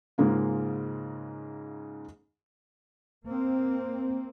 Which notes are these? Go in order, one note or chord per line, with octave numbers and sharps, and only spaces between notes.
G#2 C#3 G#3 A#3 F4
A#3 C4